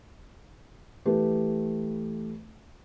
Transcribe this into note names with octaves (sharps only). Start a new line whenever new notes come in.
E3 A3 G4 B4